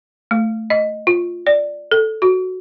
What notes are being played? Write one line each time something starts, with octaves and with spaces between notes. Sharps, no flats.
A3
D#5
F4
D5
A4
F#4